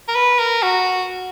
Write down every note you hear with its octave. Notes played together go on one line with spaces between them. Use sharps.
A#4
B4
A#4
F#4